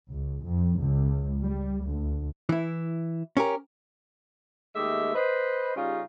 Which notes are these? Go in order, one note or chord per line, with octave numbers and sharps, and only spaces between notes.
C#2
F2
C#2
G3
D2
E3 E4
C#4 G4 A#4
D#2 G#3 A3 G4 D#5 E5
B4 C5 D#5
C#3 G3 C#4 D#4 F4 G4